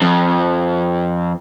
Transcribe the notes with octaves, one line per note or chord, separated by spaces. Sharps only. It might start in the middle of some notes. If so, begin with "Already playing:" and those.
F2